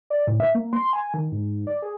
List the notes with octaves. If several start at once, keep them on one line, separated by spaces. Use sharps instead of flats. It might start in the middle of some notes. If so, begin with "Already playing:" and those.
D5
A2
E5
A#3
C6
G#5
D#3
G#2
D5
G#4